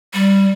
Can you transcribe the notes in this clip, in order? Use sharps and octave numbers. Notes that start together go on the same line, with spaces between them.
G3